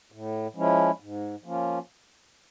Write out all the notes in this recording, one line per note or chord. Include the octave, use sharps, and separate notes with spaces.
A2
F3 G#3 C#4 E4
G#2
F3 A#3 C#4 F4